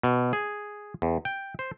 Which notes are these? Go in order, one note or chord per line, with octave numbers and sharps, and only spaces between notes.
B2
G#4
E2
G5
C5